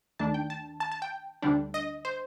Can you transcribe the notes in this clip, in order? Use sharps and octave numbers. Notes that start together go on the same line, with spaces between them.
D#2 D#3 A3 D4 A5
G5
A5
A5
A5
G5
D2 D3 G3 D4
D#5
C5